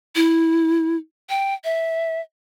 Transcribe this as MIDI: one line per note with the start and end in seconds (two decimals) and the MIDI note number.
0.16 0.96 64
1.29 1.54 79
1.64 2.21 76